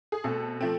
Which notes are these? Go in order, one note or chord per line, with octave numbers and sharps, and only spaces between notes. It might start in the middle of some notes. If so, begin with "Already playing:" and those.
G#4
B2 A3 C4 A4
F3 A3 C4